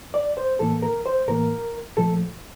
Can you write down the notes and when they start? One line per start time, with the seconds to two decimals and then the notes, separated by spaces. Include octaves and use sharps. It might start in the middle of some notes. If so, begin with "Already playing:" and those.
0.14 D5
0.37 C5
0.59 A2 E3 A#3 A4
0.82 A#4
1.05 C5
1.28 A2 E3 A#3 A#4
1.97 A#2 F3 A3 A4